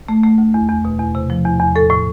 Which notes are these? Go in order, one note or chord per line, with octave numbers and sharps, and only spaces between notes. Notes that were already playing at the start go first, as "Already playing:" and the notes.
A3
A3
D2
E2
E2
B2
E2
C3
F3
E2
E2
A2 A4
A2